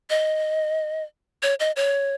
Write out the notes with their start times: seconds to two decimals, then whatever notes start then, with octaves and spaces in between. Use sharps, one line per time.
0.10 D#5
1.43 C#5
1.60 D#5
1.76 C#5